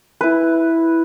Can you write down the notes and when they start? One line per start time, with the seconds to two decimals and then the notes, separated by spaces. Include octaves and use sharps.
0.21 E4 B4